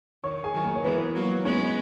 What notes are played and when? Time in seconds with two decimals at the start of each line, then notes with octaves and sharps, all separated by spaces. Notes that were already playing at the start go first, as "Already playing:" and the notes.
0.24 D#3 C#5 C#6
0.44 G#4 G#5
0.54 D#3 F#3
0.64 A#3 A#4
0.75 C#5
0.84 E3 G#3 B3 B4
1.15 F#3 A#3
1.45 G#3 B3 C#4 C#5